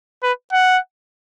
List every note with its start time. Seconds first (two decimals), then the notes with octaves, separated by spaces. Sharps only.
0.23 B4
0.53 F#5